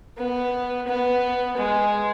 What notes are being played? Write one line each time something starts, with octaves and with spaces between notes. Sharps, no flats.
B3
B3
G#3